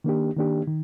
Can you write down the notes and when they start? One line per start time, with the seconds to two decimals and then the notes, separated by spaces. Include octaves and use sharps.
0.04 D#3 A#3 D4 G4
0.36 D#3 A#3 D4 G4
0.67 D#3